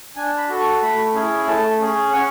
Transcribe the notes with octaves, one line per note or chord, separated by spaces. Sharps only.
D4 G#5
B5
F#4 A4
C#6
A3 B5
C#4 E4 G#4
A3 A5
C#4 G#4
C#4 F#5